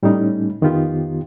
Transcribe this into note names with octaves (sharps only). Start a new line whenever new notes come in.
A2 G3 A3 C#4 D#4
F2 D#3 B3 D#4 F4 G4